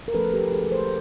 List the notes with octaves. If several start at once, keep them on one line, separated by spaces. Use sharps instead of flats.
A#4
F3 A3 C#4 A4 B4
G4 A4
G#4 A#4
A#4 C5